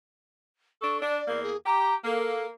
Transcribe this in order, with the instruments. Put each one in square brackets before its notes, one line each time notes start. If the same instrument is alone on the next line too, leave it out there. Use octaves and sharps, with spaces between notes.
[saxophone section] D4 A4 [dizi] C#6
[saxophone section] D4 [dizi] D5
[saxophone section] E2 A#3
[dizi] G#4
[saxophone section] G4 [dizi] A#5
[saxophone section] A#3 [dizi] A4